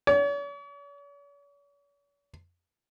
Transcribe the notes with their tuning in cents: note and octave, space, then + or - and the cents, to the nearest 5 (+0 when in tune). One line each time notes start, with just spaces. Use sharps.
C#5 +45